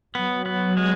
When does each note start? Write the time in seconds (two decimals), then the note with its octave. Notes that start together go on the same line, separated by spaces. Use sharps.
0.15 F#3 B3
0.46 B3
0.77 G#3